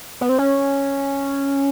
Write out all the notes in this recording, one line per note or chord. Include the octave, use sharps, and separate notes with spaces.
B3
C4
C#4